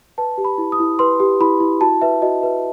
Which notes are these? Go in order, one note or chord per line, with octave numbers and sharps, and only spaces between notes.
B4 A5
G4
B5
E4
D#6
E4
B4 C6
G4
E4 B5
E4
F#4 A5
B4 E5
F#4 D#5
B4 E5